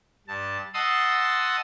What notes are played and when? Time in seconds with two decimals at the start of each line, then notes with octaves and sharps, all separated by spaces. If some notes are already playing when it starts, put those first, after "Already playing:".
0.28 G2 A5
0.74 D#5 F#5 A5 C6 D#6 E6